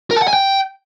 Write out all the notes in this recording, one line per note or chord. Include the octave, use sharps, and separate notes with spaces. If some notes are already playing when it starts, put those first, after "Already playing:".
A#4
A5
F#5
G#5
G5